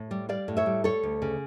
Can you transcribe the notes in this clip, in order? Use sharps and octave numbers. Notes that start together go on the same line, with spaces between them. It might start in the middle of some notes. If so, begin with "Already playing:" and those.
Already playing: A2
G3
G3 D5 F5
A2
C#5 E5
G3
G3 A4 C#5
D2
C#3